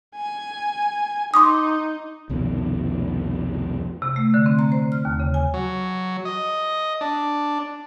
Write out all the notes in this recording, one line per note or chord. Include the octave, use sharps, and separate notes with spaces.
G#5
D#4 C6 D6 D#6
C2 F2 B2 D#3
C3
A3
D3
C4
A#5
C5
F6
D#2
C#3
G#5
F#3
D#5
D4